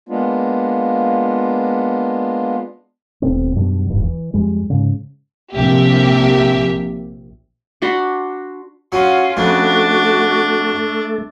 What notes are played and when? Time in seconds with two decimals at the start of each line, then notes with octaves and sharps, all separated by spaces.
0.09 G#3 A#3 B3 D4 F4
3.22 D#1 B2 A3 C4
3.55 F#2 B2 G3 D4
3.90 D#1 A1 E2 G2
4.03 E3
4.34 F2 G3 G#3
4.70 G#2 C#3
5.55 A#1 C3 G4 E5
7.82 D4 F#4 B5 C6
8.92 F#3 C#4 F4
9.37 F2 C#3 A3 D4 F#4